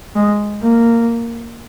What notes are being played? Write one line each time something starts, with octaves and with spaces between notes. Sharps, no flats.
G#3
A#3